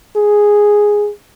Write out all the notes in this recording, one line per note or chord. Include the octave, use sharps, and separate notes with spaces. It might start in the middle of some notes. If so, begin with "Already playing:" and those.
G#4